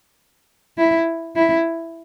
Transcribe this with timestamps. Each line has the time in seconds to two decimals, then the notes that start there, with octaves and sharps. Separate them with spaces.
0.78 E4
1.36 E4